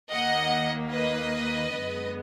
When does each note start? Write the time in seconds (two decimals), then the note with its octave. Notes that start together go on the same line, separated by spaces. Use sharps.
0.11 D#2 D#3 A#3 D#5 F#5
0.92 B4 D#5
1.75 F#2 D3 G#3 B3